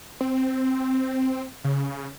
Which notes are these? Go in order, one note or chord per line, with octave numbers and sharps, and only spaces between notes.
C4
C#3